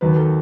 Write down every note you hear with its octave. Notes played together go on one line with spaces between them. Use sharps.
D#2 D#3 F#3 B4
A4